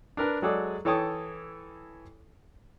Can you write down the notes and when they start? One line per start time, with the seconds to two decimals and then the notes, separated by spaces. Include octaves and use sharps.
0.17 D4 A#4 B4
0.42 F#3 G#3 G#4 A4 D5
0.85 E3 A4 C#5 G5 A5 D#6